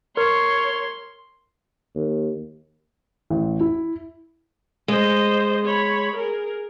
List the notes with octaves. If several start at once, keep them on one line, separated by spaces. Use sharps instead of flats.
A#4 C#5 C6
D#2
A1
E4
G#3 C5 D#5
C#5 B5
G#4 A#4